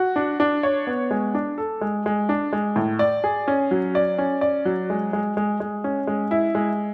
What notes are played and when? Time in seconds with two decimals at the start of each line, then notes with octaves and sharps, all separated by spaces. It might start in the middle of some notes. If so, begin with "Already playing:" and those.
Already playing: F#4
0.16 D4
0.40 D4
0.63 C#5
0.87 B3
1.11 G#3
1.34 D4
1.58 A4
1.81 G#3
2.06 G#3
2.29 D4
2.53 G#3
2.76 A2
2.99 D5
3.24 G#4
3.48 C#4
3.71 F#3
3.95 D5
4.18 C#4
4.41 D5
4.65 F#3
4.90 G#3
5.13 G#3
5.37 G#3
5.60 G#3
5.84 C#4
6.07 G#3
6.31 E4
6.55 G#3